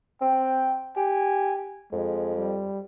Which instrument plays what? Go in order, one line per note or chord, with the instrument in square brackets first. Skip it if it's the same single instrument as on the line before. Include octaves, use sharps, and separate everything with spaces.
[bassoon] C4 [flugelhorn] G5
[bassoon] G4 [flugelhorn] G#5
[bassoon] F2 [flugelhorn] G#3
[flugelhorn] G3